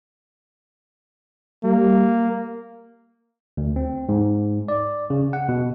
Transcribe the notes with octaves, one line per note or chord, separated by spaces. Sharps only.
G3 A#3
D2
C4
G#2
D5
C#3
F#5
B2